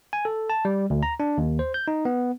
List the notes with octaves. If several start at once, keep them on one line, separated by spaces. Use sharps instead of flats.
G#5
A4
A5
G3
D2
A#5
D4
D#2
C5
G6
D#4
B3